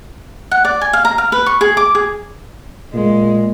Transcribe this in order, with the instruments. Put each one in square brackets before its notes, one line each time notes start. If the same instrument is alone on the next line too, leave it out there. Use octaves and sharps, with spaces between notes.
[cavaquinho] F#5
D5
G#5
F5
A#5
F5
B4
C#6
G#4
D6
G#4
[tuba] A#2 [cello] G#3